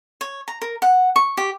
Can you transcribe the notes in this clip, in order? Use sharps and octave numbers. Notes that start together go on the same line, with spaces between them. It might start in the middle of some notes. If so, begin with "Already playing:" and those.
C#5
A#5
A#4
F#5
C#6
G4